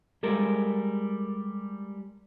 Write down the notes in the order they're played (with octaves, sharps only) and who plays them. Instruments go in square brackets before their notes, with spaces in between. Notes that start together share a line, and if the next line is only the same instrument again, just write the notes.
[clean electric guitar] G3 G#3 A4 A#4